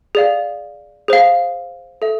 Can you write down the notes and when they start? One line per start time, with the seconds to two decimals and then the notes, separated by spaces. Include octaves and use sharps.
0.15 G#4 D5 F5
1.08 G#4 C5 F5
2.02 A4 E5